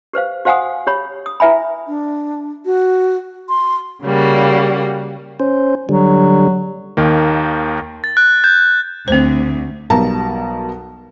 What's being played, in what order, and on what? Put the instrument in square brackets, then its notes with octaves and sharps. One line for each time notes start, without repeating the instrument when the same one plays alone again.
[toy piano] G4 B4 C5 F5
F#4 C5 F5 F#5 G#5 D#6
G4 C#5 B5
D#6
E4 B4 E5 G#5 B5
[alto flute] D4
F#4
C6
[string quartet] C#3 G3 A#3 F#4
[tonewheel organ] C#4 C5
[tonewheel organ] D3 G3 [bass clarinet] F#3
[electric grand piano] D#2 D#3 A#3
[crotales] A6
F#6
G6
[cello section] D2 [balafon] C4 C5
[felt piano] B1 B2 G3 A#4 A5 A#5